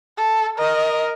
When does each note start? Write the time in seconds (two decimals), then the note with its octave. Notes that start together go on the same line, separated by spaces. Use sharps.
0.17 A4
0.58 A#4 D#5